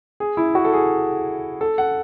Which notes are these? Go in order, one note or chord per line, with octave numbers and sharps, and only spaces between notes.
G#4
E4
F#4
A4
G#4
A4
F#5